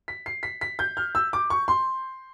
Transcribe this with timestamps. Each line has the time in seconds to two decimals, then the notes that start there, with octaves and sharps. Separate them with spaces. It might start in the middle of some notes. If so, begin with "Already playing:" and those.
0.08 B6
0.26 C7
0.43 B6
0.61 B6
0.79 G6
0.97 F6
1.15 E6
1.33 D6
1.50 C#6
1.68 C6